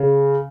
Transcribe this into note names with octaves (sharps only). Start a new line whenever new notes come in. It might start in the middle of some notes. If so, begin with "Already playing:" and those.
Already playing: C#3